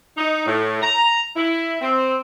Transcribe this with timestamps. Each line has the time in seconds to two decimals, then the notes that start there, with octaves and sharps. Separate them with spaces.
0.17 D#4
0.46 A2
0.82 A#5
1.36 E4
1.81 C4